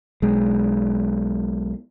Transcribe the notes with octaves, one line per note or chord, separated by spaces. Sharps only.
B1 G#3